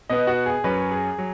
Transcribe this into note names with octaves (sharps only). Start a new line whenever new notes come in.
B2 B3 D#5
F#4
G#4
F#2 F#3 C#4 B4
G#4
F#3